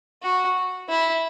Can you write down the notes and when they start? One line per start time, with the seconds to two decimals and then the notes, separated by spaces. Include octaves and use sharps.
0.22 F#4
0.89 E4